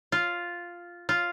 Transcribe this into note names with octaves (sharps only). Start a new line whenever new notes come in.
F4
F4